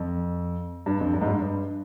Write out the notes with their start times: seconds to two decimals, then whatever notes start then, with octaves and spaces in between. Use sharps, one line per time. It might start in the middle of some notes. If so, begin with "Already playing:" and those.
Already playing: F2
0.86 G2
1.00 F2
1.13 G2
1.21 G#2
1.28 G2
1.42 G2